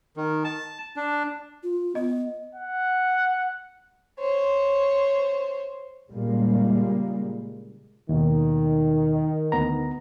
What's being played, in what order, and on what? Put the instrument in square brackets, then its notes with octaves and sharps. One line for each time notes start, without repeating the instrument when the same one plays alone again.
[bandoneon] D#3
A5
D4
[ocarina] F4
[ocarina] B3 [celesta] D#5
[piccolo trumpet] F#5
[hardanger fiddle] C5 C#5
[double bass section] A#2 C#3 G3 G#3 A#3
[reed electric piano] D#2 B2 [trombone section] D#3
[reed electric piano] D2 B3 A#5